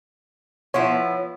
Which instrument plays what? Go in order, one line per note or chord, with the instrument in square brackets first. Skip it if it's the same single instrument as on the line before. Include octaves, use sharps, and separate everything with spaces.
[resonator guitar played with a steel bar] F3 B3 E4 [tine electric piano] C#5